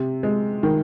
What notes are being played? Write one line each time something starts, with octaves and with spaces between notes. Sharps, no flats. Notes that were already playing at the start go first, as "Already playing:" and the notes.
Already playing: C3
G#3
D#3